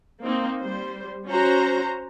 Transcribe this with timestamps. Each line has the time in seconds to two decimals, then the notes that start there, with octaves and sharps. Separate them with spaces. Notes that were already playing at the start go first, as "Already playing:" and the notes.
0.23 A#3 C4 D#4
0.60 G3 C5
1.28 C#4 F#4 C5 A#5